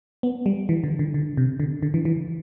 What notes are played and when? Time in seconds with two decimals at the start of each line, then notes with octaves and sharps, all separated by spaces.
0.23 B3
0.46 G3
0.69 E3
0.84 D3
0.99 D3
1.14 D3
1.37 C3
1.60 D3
1.83 D3
1.94 E3
2.05 E3